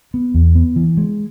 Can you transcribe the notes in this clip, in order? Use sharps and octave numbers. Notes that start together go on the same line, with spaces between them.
B3
E2
B3
E3
G#3